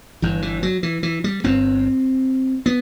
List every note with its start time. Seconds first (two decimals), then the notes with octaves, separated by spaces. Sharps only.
0.22 G1 G2 E3
0.42 E3
0.63 F#3
0.83 E3
1.03 E3
1.24 G3
1.44 G1 G2 C4
2.66 B3